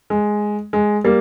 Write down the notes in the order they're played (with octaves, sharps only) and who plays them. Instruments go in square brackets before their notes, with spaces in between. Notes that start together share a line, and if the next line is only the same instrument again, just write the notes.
[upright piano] G#3
G#3
G3 A#3